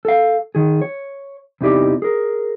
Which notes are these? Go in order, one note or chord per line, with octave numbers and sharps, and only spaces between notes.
A4 F5
D#3 G#4
C#5
E2 C3 E3 D#4 G4 D5
G#4 A#4